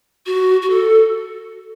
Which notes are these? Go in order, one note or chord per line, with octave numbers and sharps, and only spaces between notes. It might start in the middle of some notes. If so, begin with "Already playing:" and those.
F#4
F#4
A4